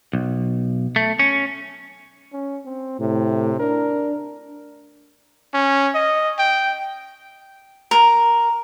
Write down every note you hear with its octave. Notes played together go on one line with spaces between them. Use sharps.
B1
A3
C#4
C#4
C4
A2 C3
D4 A#4
C#4
D#5
G5
A#4